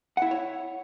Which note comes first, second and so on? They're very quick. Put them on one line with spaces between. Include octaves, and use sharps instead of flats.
F#5 E4 E5 C#5